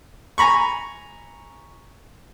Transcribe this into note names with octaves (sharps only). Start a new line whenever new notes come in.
G#5 A#5 B5 C#6